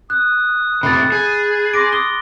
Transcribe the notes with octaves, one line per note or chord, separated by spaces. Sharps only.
D#6 F#6
C3 A3 B5 A6
G#4
C6 D6 A#6 D7
D6 D#6 G7